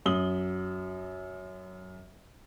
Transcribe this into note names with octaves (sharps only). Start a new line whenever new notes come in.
F#2 D#6 F#7 G7